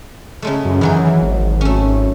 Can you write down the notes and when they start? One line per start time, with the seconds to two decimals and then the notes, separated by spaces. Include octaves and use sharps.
0.42 C#3 G#3 A3
0.65 F#2
0.81 D#3 E3 F#3 G#4
1.22 G#1
1.61 A3 C#4